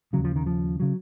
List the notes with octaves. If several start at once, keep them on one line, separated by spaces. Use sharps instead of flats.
D#2 C#3 F#3
F3
D#3
F3
C#3 F#3